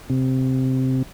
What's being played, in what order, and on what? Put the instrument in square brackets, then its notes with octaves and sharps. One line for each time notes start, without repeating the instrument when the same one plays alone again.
[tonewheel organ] C3